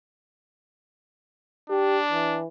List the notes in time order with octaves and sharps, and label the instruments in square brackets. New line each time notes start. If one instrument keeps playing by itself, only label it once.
[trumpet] D4 [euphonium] G4
[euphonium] E3